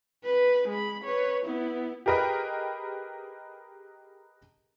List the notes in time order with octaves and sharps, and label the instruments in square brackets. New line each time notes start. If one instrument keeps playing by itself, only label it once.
[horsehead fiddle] B4
G#3 B5
B4 C#5
B3 E4
[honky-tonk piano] G4 G#4 A#4 B4 D#5 G5